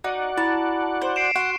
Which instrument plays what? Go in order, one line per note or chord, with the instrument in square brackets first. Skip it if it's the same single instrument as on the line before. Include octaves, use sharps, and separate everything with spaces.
[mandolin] D#4 [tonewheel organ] F#4 D5 F#5
[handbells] E4 A#5 [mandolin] A5
[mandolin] C5
[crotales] C7 D7 E7
[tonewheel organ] F#4 C6 [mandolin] F#5 [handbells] C#6